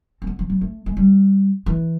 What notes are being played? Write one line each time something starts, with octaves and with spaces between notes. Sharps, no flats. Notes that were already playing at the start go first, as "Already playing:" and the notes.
C4
B3
F3
F#3
A3
G#3
G3
E3